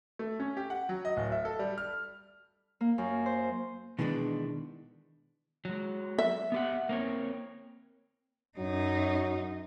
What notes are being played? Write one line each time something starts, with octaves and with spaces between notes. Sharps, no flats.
A3
C#4
G4
F#5
F#3
D#5
D1
E5
A4
G3
F6
A#3
F#2
C5
B2 D#3 E3 G#3 B3 D4
F#3 G#3
E5
B3 G4 F#5
A#3 C4 C#5
F#2 F#3 D#4